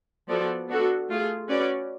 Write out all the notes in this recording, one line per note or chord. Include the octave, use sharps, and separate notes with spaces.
F3 B3 F#4 A4 D5
B3 D4 F#4 A4
A3 F4 G#4
C#4 F#4 B4 D5